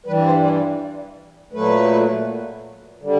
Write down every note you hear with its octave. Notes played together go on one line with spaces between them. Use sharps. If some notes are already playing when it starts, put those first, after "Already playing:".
G2 E3 G3 B4
C5
D5
A#2 F#3 A3 B4
D3 G3